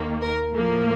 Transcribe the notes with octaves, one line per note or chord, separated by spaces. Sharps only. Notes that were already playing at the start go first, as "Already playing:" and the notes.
Already playing: D#2 D#3 A#3
A#4
A2 F3 A#3